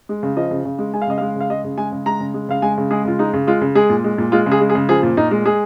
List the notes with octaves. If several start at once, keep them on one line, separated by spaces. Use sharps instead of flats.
G#3
C#3
F3 D#5
C#3
C#3
G#3
G#3 G#5
F5
C#3 D#5
G#3 F5
C#3 F5
G#3 D#5
C#3
G#3 G#5
C#3
G#3 A#5
C#3
G#3
C#3 F5
G#3 G#5
C#3
G#3 G#4
C#3 F4
G#3 D#4
C#3
G#3 F4
C#3
G#3 G#4
A#2
G#3
A#2
G#3 F4
C#3
G#4
G#3
G#4
C#3
F3 G#4
A#2
A#2 D#4
G#3
G#3 G#4